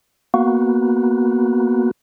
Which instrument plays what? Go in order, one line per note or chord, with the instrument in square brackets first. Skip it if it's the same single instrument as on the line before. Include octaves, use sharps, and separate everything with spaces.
[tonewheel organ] A#3 B3 F#4